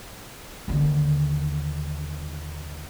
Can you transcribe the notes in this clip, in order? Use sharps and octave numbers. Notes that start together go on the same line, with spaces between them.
D#2 D3